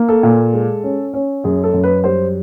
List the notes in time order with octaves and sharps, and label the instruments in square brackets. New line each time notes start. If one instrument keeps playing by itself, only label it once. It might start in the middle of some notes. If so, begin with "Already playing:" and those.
Already playing: [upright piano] A#3
A4
A#2
G#3
C#4
C#4
F#2 G#4
A4
F#2
B4
G3 C5